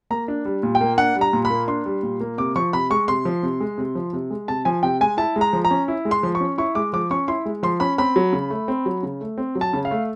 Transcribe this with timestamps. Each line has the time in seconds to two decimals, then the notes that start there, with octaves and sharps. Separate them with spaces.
0.10 A#3 A#5
0.28 D4
0.45 G3
0.63 A#2
0.75 G5
0.81 A#3
0.98 D4 F#5
1.16 G3
1.21 A#5
1.33 A#2
1.45 B5
1.50 A#3
1.68 D4 C6
1.86 G3
2.03 A#2
2.20 A#3
2.38 C3 D6
2.56 F3 C#6
2.73 C3 B5
2.90 G#3 C#6
3.08 C3 C6
3.25 F3
3.43 C3
3.60 G#3
3.78 C3
3.95 F3
4.13 C3
4.30 G#3
4.48 C3 A5
4.65 F3 G#5
4.83 C3 G5
5.01 G#3 G#5
5.17 E4 A5
5.36 G#3
5.41 A#5
5.53 F3
5.65 A#5
5.71 C#4
5.88 E4
6.05 G#3
6.11 C6
6.23 F3
6.35 C#6
6.40 C#4
6.58 E4 C#6
6.75 G#3 D6
6.93 F3 D6
7.11 C#4 C#6
7.28 E4 C6
7.45 G#3
7.63 F3 C6
7.80 C#4 B5
7.98 C4 B5
8.16 F#3
8.33 C#3
8.50 A3
8.68 C4
8.86 F#3
9.03 C#3
9.21 A3
9.38 C4
9.55 F#3
9.61 A5
9.73 C#3
9.85 F5
9.91 A3